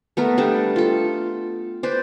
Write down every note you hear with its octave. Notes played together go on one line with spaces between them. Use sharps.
A3 B3 A#4
G3 A3 D4
F4 A4
B4 C5 D5